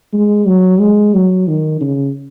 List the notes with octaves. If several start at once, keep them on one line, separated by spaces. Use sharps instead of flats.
G#3
F#3
G#3
F#3
D#3
C#3